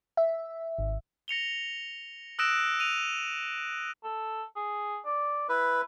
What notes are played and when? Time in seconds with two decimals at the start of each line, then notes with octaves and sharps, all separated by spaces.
0.17 E5
0.78 G#1
1.28 A#6 C#7 F7 G7
2.39 D#6 E6 F#6 A#6 D7 E7
2.80 D#7 F7
4.04 A4
4.56 G#4
5.05 D5
5.49 E4 B4